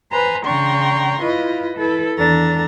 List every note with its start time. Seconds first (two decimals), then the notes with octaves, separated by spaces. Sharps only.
0.11 B4 C5 G#5 A#5 C6
0.44 C#3 D4 G5 A#5 C6 C#6
1.21 E4 F4 B4 D#5
1.75 E4 A4 B4
2.17 E2 D#3 D4 A4 A#5 A6